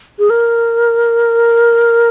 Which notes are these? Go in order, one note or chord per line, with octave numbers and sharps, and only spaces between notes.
G#4
A#4